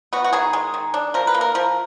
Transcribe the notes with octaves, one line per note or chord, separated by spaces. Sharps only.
B3 F#4
F#4
D#3 G#4
G#3
D#3
D4
F3 A#4
B4
A#3
A#4
F3 A#4